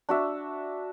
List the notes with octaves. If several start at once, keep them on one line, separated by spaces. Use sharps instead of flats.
D4 F#4 E5